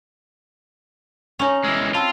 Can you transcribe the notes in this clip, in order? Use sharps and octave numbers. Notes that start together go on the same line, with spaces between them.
C#4 D#4 C#5 G#5 F7
E3 G#3 E6 F6
C4 F4 A5 B5 E6